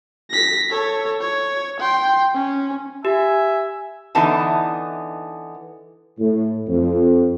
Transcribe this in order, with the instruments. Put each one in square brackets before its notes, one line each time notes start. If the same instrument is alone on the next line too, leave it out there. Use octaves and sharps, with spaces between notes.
[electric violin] A#6 B6
A4 C#5
C#5
G5 C6
C#4
[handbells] G4 [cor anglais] E5 [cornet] G#5
[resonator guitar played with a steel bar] D3 E3 B3 D#4 A5
[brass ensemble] A2
F2